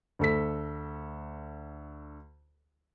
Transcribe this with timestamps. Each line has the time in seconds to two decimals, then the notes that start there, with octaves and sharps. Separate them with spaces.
0.19 D2 A4 B6